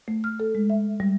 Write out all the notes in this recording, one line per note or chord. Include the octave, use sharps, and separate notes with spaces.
A3
F6
A4
G#3
E5
G3